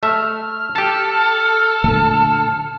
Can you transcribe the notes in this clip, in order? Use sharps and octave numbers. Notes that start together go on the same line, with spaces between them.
A3 E5 F6
G4 A4 A5
A#2 D3 A3